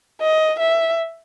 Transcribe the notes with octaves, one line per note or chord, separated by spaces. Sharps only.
D#5
E5